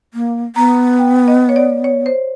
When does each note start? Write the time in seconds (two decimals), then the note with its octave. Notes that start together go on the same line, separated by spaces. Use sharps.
0.14 A#3
0.56 B3 A#5
0.99 G5
1.28 D#5
1.49 C#5
1.56 D5
1.84 C#5
2.06 C5